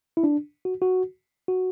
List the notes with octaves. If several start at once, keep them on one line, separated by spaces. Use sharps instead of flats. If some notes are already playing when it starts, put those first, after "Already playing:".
E4
D4
F#4
F#4
F#4